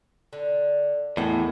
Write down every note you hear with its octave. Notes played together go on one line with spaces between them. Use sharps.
D3
E2 A2 D#3 G#3 A#3